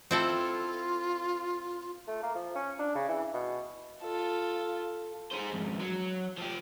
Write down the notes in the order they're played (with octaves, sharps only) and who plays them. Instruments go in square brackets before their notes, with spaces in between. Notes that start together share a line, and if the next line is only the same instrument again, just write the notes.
[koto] C4 E4 A4 [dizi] F4
[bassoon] A3
A#3
F3
C#4
D4
C#3
E3
B2
[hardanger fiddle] F4 A4
[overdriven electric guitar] G#4 C5
F2 G#2
F#3
F3 G4